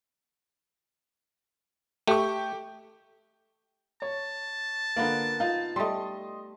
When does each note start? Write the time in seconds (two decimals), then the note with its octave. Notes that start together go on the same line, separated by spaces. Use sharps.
2.08 A3 G4 C#6
4.02 C#5 A5
4.96 D3 A#3 B3 F4 D5
5.40 D#4 F4
5.76 G3 A3 D#5 C6